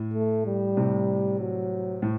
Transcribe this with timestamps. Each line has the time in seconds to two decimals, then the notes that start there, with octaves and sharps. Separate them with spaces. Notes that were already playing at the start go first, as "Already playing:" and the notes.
Already playing: A2
0.14 A3
0.46 G3
0.77 A2 C3
1.39 F#3
2.02 A2